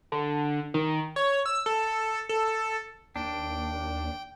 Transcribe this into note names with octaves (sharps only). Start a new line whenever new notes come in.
D3
D#3
C#5
E6
A4
A4
D#2 D4 G5